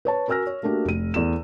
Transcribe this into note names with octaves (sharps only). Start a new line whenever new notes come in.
B4 C#5 A5
F#4 A#4 G#5 E6 F6 A#6
C#5
A3 A#3 D4 F#4 G4
F1 D#7
E2 A4 E7